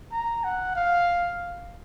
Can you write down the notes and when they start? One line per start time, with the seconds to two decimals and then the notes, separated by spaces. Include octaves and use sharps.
0.12 A#5
0.44 F#5
0.76 F5